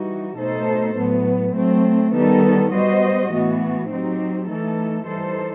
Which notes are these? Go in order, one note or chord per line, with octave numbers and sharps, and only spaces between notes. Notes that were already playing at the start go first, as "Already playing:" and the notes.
Already playing: E3 G3 D#4 F#4
B2 A3 D#4 A4 C5
A2 F#3 B3
F#3 A3 C4
D#3 G3 B3 D#4 A4
G3 B3 F#4 C5 D#5
A2 E3 B3 F#4
F#3 C4 D#4 G4
E3 A3 D#4 A4
E3 G3 D#4 A4 C5